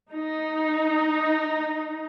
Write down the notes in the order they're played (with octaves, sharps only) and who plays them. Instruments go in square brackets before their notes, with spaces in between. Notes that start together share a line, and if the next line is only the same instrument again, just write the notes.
[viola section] D#4